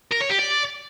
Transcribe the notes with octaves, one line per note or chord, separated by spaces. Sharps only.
A#4
C#5
G4
D5